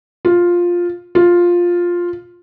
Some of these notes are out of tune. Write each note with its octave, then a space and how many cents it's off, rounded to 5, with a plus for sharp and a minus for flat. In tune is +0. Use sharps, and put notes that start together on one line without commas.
F4 +5
F4 +5